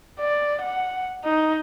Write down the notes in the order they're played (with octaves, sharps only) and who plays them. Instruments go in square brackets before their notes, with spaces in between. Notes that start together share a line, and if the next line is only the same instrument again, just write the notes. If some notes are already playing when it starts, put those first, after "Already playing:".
[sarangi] D5
F#5
D#4